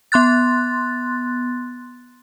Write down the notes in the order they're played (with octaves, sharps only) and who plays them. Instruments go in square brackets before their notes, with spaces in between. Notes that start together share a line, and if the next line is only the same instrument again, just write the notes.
[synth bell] B3 C6 F#6 A6